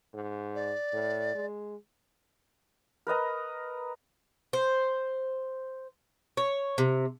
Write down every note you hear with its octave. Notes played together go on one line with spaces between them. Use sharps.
G#2
D5
A2
G#3
A#4 B4 D#5 A#5
C5
C#5
C3